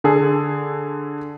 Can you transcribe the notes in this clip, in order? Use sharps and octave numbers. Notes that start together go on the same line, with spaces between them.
D3 G#4 A4